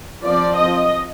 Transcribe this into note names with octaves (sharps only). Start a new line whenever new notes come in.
F3 C4 D5
D#5